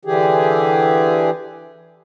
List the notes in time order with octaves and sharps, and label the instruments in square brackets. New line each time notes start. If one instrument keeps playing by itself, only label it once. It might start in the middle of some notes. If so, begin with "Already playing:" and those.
[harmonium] D3 E3 G4 G#4